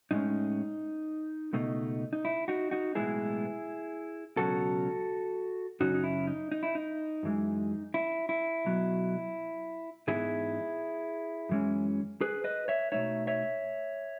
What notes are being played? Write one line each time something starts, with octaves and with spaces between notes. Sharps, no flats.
A2 G#3 C#4 D#4
C#2 B2 A3 D#4
D#4
E4
D#4 F#4
D#4 F#4
B1 A2 E3 G#3 B3 E4 G#4
C#2 B2 F#3 C#4 F#4 A4
F#2 C#3 F#3 C#4 D#4 F#4
D#4
E4
D#4
D#4
E4
D#4
F#2 E3 G#3
E4
E4
B1 B2 F#3
G#2 E3 B3 D#4 E4 G#4
F#2 E3 G#3 C#4
G#4 B4
B4 D#5
C#5 E5
B2 A3 D#4 C#5 E5
C#5 E5